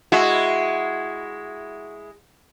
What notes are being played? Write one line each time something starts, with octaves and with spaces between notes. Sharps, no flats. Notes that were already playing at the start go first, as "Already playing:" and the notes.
G#3 E4 F#4